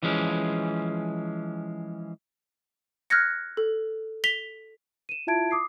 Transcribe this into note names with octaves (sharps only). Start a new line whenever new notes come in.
E3 F3 G#3 C#4
F6 F#6 G#6 A#6 C#7
A4
B6 F7 G7
D#7 E7
E4 F4 E5 A5 G#6 D7
D6 D#6 C7